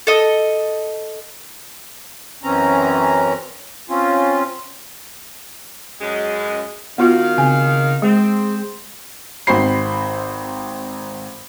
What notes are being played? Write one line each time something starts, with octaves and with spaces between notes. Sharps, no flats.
A4 D#5
F#2 E3 C4 C#4 A#5
C4 C#4 F4
F#2 G#3 D#5
D#3 B3 F4 F#4 F5
C#3 C4 G#5
G#3 C4 G#4
G#1 C4 F#4 C5 B5 C7